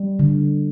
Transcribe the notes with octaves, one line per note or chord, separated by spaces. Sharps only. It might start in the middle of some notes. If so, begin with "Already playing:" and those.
Already playing: G3
D3